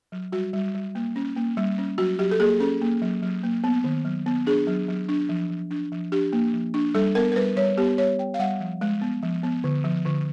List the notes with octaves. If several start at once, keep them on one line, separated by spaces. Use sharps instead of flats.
F#3
G3 F#4
G3
G3
A#3
C#4
A#3
G3
C#4
F#3 F#4
F#3 G4
A4
A#3 G#4
C#4 A4
A#3
F#3
F#3
A#3
B3
D#3
F#3
B3
D4 G#4
F#3
F#3
D4
F3
F3
D4
F3
D4 G4
A#3
F3
D4
G3 A4
B3 A#4
A#4
G3 B4
G3 C#5
B3 G4
G3 C#5
G3 G5
F5
G3 F#5
F3
G#3
B3
F3
B3
D3
F3
D3